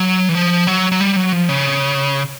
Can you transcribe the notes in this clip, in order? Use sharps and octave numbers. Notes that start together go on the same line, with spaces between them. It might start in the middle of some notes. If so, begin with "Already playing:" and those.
Already playing: F#3
E3
F3
F#3
F#3
G3
F#3
F3
C#3